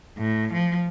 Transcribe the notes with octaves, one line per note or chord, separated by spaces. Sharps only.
A2
F3